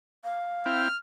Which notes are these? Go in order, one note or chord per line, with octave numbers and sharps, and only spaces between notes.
F5
C4 E4 G5 F6